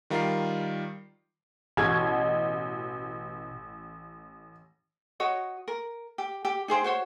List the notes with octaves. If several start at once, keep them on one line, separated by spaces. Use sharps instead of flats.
D#3 G3 F4 A#4 G5 C7
A1 B2 G#6
F#4 C#5 D#5
A#4
G4
G4
D#4 G#4 C5 G5
F#4 C5 C#5